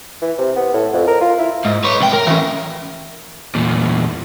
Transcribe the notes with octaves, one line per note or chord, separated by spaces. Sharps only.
E3
C3
B3
A2
F2
A#4
F4
E4
G#2
B4 C#5
C2 G5
A#4
E3 C#4
E2 A#2